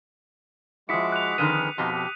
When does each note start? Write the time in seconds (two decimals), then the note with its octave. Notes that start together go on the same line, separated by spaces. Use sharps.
0.89 F3 G#3 E4 F#4 D6 D#6 B6 C#7
1.12 F#6 F7
1.38 F2 D3 D#3 G#4 B4 D#7
1.78 F2 B2 D#4 G4 C6
1.92 G4